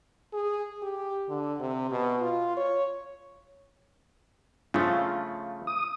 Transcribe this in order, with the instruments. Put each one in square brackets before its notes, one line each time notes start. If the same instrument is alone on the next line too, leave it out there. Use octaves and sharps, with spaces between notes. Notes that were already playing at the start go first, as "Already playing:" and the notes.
[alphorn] G#4
G4
D3
C3
B2
F4
C#5
[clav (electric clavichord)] C#3 F3 A3 [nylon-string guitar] F4
[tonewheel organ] D#6